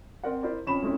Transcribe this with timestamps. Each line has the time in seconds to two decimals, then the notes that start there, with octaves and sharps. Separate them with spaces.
0.24 C4 A#4 D5 F#5
0.43 E4 A#4 C5 D5
0.67 F2 C#4 B5 E7
0.82 G#3 A3 C4 C#4 E4